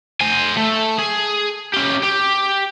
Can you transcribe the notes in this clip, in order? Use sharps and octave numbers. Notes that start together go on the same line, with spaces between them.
C5 G#5
A3
G#4
C#4 G4
G4